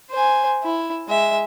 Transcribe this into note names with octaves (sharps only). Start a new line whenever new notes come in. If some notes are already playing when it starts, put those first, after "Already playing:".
C5 G#5
E4
G#3 E5